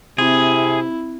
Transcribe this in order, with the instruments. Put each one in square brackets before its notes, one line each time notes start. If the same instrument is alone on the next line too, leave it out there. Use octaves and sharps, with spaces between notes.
[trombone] C3 [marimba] C4 [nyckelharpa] E4 [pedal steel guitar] G#4